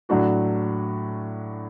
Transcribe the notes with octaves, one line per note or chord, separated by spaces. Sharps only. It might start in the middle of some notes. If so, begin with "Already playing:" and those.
A2 F#3 D4 F#4